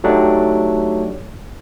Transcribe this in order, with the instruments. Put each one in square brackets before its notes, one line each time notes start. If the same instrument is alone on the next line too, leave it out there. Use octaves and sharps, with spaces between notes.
[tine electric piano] F#3 A3 D4 D#4 G4